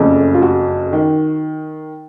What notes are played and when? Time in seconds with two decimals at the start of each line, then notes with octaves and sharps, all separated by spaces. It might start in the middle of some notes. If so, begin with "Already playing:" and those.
Already playing: F#1 F2 C#3 A3
0.34 F4
0.42 F#4
0.93 D#3